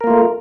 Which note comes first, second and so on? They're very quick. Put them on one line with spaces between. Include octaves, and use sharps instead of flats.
A#4 A#3 F4 A3